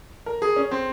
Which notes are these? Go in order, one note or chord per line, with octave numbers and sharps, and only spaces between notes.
A#4
G#4
C#4
C4